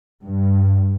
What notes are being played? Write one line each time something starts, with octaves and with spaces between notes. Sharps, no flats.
G2